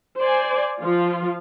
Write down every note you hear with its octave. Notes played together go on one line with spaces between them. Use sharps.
C5 D5 G#5
F3 F4